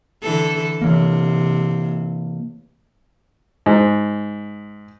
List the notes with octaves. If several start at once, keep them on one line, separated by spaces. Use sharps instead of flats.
D3 E3 A4
C3 E3 A#3
G#2